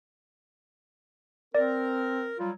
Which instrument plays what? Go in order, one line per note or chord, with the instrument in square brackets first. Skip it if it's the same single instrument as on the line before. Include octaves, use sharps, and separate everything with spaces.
[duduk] C4 [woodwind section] A#4 [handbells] D5
[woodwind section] F#3 G3 [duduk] F4